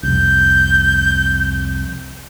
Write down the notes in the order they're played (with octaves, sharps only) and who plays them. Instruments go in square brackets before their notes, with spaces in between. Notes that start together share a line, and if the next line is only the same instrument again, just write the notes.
[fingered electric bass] C2 F2 [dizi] G6